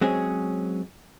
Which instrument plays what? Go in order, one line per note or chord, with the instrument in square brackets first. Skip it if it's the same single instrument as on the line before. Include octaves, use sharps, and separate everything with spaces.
[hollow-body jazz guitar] F#3 G#3 C4 C#4 G#4